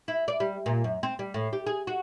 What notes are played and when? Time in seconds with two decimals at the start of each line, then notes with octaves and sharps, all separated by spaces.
0.08 E4
0.28 D5
0.40 G3
0.66 A#2
0.84 F#2
1.03 C4
1.19 G3
1.34 A2
1.53 G4
1.67 G#4
1.87 F#4